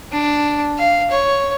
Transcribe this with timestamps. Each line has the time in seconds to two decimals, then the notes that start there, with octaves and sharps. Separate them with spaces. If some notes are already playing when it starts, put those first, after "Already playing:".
0.12 D4
0.78 F5
1.11 C#5